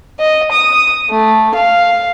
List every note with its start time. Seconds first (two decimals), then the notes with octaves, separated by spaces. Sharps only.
0.20 D#5
0.52 D#6
1.10 A3
1.56 F5